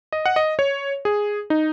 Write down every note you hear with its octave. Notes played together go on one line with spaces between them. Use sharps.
D#5
F#5
D#5
C#5
G#4
D#4